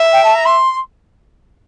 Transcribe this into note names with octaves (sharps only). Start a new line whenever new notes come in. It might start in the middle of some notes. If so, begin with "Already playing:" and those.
Already playing: E5
G5
A5
A#5
C6